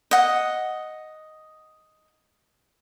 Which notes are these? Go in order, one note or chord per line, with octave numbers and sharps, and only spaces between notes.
D#5 F#5